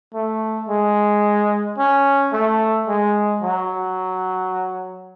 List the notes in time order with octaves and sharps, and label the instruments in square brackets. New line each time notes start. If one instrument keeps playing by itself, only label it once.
[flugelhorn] A3
G#3
C#4
A3
G#3
F#3